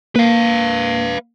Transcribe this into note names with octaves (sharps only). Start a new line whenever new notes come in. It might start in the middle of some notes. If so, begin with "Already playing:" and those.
A#3 B4 F5